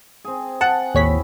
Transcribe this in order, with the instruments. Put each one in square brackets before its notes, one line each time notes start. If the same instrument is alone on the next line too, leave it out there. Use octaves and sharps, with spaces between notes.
[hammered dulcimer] C4 G#4
[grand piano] F#5 [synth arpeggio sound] A5
[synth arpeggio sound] A1 C#5 B6 [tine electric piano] D#2 [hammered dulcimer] E4 F#4 G#4